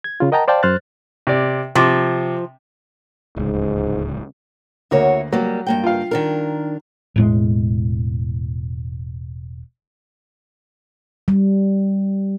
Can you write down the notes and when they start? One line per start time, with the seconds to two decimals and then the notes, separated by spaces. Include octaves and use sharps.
0.04 G#6
0.20 C#3 F4
0.32 A#4 D#5 F#5 G5 A5 A#5
0.48 C5 D5 F5 G5 A5
0.63 F#2 C5 F6 F#6 A6
1.27 C3 D5
1.75 C3 F3 D6
3.37 D1 C#2 G#2
4.91 D2 A#3 E4 F#4 C#5
5.32 F#3 G3 A#3
5.66 G2 A#3 G5
5.84 F4 F5
6.11 D#3 D4 A#4
7.16 E1 A2 G#3
11.28 G3